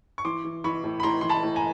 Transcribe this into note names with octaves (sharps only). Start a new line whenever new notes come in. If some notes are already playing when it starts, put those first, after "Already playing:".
C#6
E3 C6 D6
E3
E3 B5 C#6
A2
B5
A2 A#5 C6
E3 C6
A5 B5
A2
G#5 A#5